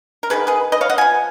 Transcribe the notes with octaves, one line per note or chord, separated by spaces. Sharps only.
A#4
D#3 G#3 B3 G#4 B4
G#4 B4
B4 D#5
C#5 F5
D#5 F#5
F3 B3 F5 G#5